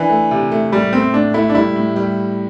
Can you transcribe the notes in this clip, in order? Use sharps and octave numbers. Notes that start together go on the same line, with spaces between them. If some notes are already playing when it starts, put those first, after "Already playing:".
Already playing: E3 D4
A3
C3
A3
A2 G3
A3 C4
A2 D4
A3 E4
D4
G3 E4
A2
G3